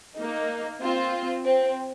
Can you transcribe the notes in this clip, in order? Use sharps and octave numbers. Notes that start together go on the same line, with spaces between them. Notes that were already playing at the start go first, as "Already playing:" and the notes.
A#3 D#4
C4 F4
C4